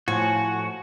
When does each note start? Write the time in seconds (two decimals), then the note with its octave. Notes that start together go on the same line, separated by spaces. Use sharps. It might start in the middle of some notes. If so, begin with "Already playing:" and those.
0.08 A2 F3 F#4 G#5